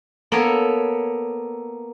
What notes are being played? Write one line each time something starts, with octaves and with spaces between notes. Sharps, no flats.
A#3 B3 A4 A#4 C#5